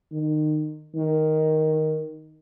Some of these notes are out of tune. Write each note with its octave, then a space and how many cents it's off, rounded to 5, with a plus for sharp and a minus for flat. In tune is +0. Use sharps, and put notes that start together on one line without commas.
D#3 -25
D#3 +5